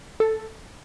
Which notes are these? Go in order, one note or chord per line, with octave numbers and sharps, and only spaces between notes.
A4